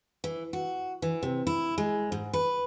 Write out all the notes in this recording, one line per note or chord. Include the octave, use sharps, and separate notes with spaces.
E3
F#4
E3
C3
E4
G#3
G#2
B4